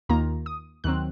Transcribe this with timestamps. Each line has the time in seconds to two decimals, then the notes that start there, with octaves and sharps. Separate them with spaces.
0.09 D#2 D#3 A#3 F4 A#5
0.46 D#6
0.84 D#2 D#3 F#3 C4 F#6